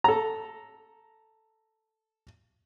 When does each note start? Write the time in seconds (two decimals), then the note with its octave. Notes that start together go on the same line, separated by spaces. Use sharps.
0.04 A4 A#5